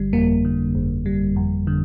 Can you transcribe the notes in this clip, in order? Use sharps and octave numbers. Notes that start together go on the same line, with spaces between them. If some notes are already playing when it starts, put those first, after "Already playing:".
Already playing: G1 D3 G3
F2 A#3
D3
G1
G3
F2
D3